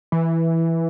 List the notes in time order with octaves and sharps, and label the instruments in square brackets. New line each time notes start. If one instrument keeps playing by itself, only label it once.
[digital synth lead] E3